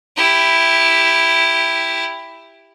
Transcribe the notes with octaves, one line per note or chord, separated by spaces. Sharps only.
E4 G4